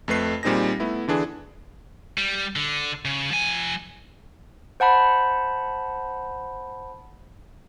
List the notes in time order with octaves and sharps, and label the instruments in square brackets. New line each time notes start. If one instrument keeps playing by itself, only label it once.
[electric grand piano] F2 A3 B4 C7
A#2 G3 C4 D#4 G#4 A#6
A3 B3 E4
D3 E3 D4 G#4
[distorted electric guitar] G3
D3
C#3
F3 G#5
[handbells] C5 F#5 A5 B5